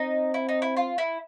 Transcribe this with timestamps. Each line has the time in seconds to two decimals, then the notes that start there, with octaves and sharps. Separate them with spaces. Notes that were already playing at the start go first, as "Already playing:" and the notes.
Already playing: C4 D#4
0.34 E4
0.49 D#4
0.62 E4
0.77 F4
0.98 E4